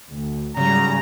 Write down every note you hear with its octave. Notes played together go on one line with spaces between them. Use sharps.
D2
G#2 C#3 F#3 G3 A#5